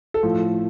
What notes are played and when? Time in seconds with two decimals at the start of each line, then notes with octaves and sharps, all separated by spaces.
0.14 A4
0.23 A2 F3